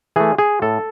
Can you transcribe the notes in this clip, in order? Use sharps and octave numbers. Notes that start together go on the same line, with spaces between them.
E3 A3 G#4
G#4
A2 A4